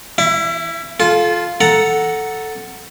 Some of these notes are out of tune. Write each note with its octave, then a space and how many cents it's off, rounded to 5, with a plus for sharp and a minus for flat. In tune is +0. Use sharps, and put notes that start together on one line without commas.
E4 -5 E5 +35
F4 +0 A4 -30
A4 +0 F#5 +0 A#5 +0